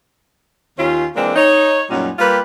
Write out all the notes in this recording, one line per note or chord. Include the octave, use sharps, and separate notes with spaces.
D#2 C#4 F4
E3 G#3 A#3 C4 D4
D#4 C#5
F#2 A#2 G3 B3 C#4 D#4
G3 A#3 F4 G4 B4